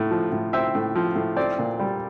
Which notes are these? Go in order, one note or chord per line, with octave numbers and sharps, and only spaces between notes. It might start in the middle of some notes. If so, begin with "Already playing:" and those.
Already playing: A2
F3
A2
C4 E5
A2
F3
A2
C4 D5
A#2
G3